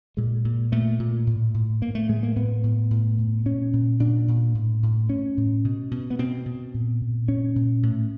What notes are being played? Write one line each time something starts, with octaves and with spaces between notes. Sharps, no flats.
A#2 G#3
A#2
A#2 A3
A#2
A2
A2
A2 A#3
A3
A2 G#3
A#3
A2 B3
A2
A2
A2
A#2 C#4
A#2
A#2 D4
A#2
A2
A2
A2 C#4
A2
B2
B2
B3
B2 C4
B2
A#2
A#2
A#2 C#4
A#2
A2